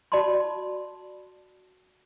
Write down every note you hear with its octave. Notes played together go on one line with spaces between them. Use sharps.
F#4 D5 A5 B5 C6